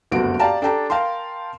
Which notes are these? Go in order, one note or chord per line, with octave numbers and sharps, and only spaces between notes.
F#1 D2 G2 B3 F#4 D7
G4 D5 F5 G5 A5 A#5
D4 G4 A4 G5 A5 A#5
A#4 F5 G5 A5 C6